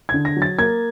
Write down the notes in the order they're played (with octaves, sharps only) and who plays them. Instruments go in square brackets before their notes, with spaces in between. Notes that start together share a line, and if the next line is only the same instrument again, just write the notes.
[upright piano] D3 G#6
A#6
F#3
A6
A#3 G#6